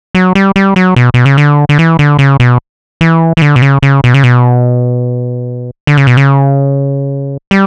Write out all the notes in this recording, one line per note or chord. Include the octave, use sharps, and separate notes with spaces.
F#3
G3
G3
F#3
B2
B2
C#3
D3
D3
E3
D3
C#3
B2
E3
E3
D3
B2
C#3
C#3
B2
C#3
B2
D3
C#3
B2
C#3
G3